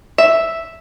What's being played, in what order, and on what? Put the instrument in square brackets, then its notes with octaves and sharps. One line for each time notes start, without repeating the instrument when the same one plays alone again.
[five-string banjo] E5